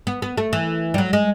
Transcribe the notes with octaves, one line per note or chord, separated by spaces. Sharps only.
B3
B3
A3
E3
G3
F#3
G#3